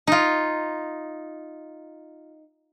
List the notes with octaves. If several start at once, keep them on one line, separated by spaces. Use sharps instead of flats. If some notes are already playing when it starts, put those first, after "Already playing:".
D#4 F4